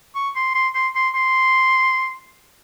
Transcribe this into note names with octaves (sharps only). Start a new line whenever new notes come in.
C#6
C6
C6
C6
C6
C6